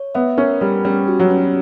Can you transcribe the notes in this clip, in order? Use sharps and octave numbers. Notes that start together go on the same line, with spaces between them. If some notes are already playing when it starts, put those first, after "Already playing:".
Already playing: C#5
B3 E5
C#4 A#4
G3 A#4
G3 C#4
F#4
F#3
C#4